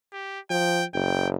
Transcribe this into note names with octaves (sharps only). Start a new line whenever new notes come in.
G4
F3 G5
F#1 G5